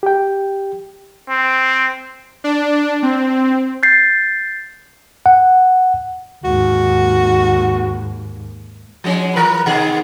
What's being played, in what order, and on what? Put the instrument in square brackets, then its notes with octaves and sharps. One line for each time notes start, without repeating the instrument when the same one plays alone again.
[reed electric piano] G4 G5
[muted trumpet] C4
[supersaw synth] D4
C4
[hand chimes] G6 A6 C7
[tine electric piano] F#5
[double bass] D#2 G#2 [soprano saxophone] F#4
[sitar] F3 G#3 C#4
E3 A#4 B4
B2 D#3 G#4